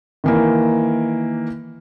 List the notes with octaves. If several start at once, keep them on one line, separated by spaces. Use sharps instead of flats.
D#3 E3 A#3